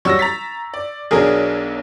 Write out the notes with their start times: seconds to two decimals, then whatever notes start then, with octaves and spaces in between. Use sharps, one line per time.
0.05 F#3 G3 C#6 E6 A#6
0.19 A#5 A6 B6
0.74 D5
1.11 B1 F#3 D4 G#4 A#4